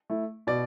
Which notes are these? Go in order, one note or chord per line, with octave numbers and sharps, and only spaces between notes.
A3 E4
B2 D5